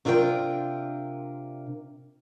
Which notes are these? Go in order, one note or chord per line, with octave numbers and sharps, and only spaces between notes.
C3 D4 F4 A#4 C5 G5